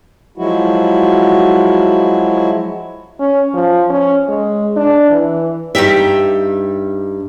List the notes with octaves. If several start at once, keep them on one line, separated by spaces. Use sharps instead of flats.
F3 F#3 G#3 E4 F#4
C#4
F3
C#4
G#3
D4
E3
G2 D#4 G4 E5